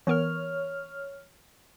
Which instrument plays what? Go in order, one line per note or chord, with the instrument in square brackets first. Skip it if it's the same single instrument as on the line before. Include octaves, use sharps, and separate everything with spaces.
[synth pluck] E3 B3 A#4 [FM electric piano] C#5 F6